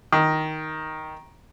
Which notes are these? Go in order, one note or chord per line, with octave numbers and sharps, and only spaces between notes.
D#3